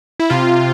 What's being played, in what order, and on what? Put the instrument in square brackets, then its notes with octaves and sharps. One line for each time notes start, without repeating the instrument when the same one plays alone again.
[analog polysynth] E4
C3 F4